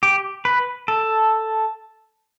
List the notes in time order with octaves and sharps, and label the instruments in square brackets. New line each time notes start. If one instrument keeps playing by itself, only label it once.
[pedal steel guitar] G4
B4
A4